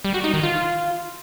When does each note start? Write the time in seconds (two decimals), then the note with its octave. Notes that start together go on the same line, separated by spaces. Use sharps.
0.04 G3
0.14 F#4
0.24 D#4
0.34 D#3
0.43 F4